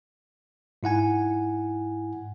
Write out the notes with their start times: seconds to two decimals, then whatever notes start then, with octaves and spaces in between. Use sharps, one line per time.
0.83 G#2 E4 F#5 G#5